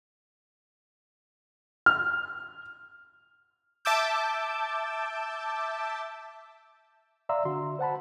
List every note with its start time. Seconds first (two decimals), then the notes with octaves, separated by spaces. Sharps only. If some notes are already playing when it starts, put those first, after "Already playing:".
1.86 F6
3.85 E5 A5 D6 E6 G6
7.29 D5 E5 F5 A#5 C6 E6
7.45 D3 F#4 C6
7.79 C5 F#5 A5 B5